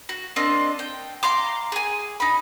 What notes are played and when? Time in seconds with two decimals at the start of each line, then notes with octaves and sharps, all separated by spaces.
0.09 F#4
0.36 A#3 C4 D4 D#5
0.79 G5
1.23 F5 A#5 C6 D6
1.72 G#4 G#5
2.20 D#4 B5